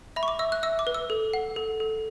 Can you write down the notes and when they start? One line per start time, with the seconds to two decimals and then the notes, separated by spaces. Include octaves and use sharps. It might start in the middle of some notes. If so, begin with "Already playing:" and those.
0.16 E5 B5
0.23 C#6
0.28 D6
0.39 E5 E6
0.52 F#6
0.63 E5 E6
0.79 D6
0.87 B4
0.94 E6
1.10 A4
1.33 F#5
1.56 A4
1.80 A4